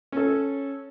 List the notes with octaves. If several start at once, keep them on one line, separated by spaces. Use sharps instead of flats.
C#4 A4